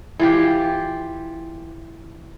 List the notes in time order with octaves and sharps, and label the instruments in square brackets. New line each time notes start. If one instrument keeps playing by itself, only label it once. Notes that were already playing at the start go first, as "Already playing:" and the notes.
[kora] E3 F4 G4